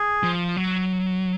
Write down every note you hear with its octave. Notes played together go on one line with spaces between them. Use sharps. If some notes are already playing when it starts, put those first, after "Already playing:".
Already playing: G#4
F3
F#3